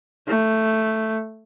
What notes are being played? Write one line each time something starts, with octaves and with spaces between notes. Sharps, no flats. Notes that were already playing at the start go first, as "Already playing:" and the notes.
A3